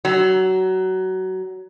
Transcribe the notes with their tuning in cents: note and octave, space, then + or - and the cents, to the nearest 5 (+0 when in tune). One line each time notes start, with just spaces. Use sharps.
F#3 +20